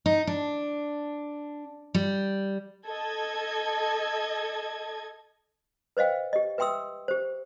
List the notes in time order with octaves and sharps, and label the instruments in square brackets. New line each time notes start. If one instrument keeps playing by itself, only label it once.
[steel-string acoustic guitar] D#4
D4
G3
[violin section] A4 D#5 G#6
[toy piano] B4 C5 D#5 F5 G5
G4 D#5
B4 E5 G5 C6 D#6 E6
G4 C5